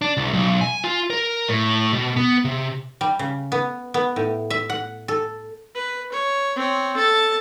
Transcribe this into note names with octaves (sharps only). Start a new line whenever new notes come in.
D4
C2
B1
G#5
F4
A#4
A2
B2
B3
C3
G3
C#3
B3
B3
A2
E5
F#5
A4
B4
C#5
C4 C#5
A4 A5